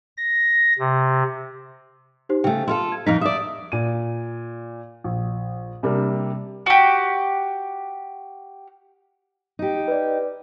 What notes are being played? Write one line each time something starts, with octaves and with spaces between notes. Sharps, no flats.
A#6
C3
D#4 G4 C5
C#3 A3 G5
E4 F4 A4 C6
G#6
F2 A#2 D#4 B6
D5 E5 D#6
A#2 D#7
A#1
C3 G3 A#3 D4
F#4 G4
D#4 G4
B4 D5